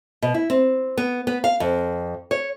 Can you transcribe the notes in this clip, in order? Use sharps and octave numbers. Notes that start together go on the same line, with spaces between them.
B2
E4
C4
B3
B3
F5
F2
C#5